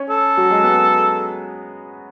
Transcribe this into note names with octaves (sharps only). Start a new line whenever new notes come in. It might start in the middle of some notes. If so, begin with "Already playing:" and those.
Already playing: C#4 C#5
A4
F#3 F#4
G#3 G#4
B3 B4